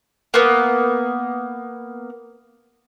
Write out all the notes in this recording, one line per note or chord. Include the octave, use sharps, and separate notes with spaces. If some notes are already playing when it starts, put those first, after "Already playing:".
A#3 B3